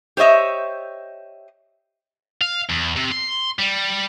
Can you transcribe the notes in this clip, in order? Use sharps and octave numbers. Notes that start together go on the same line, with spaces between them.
G4 C5 C#5 D#5 E5
F5
E2
C3
C6
G3